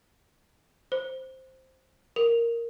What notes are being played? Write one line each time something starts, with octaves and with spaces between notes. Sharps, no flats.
C5
A#4